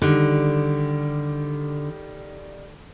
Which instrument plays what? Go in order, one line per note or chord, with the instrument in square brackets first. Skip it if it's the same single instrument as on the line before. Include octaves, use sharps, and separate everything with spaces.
[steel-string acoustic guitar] D3 [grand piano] D#3 G3